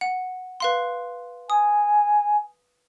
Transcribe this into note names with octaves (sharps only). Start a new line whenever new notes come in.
F#5
B4 F5 C6
G#5 D#6